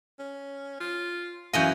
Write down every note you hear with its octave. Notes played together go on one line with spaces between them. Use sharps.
C#4
F4
F#2 E3 F#4 D#5 F5 G#5 G6